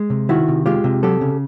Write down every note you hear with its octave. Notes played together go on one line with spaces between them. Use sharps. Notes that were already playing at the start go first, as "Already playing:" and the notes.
Already playing: G#3
C3
D#3 E4 F#4
C3
G#3 F4 G4
C3
F#3 G4 A4
C#3